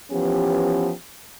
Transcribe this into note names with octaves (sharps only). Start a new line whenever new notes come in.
E3 F3 B3 C#4 G4